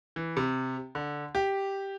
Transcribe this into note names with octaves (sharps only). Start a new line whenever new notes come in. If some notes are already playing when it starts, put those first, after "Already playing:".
E3
C3
D3
G4